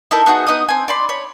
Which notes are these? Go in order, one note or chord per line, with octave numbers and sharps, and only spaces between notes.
D#4 E4 A4 A#4
B3 D#4 F#4 G#4
B3 D#4 D#5 D#6
C4 G#5
D5 B5 C6
C#5 B5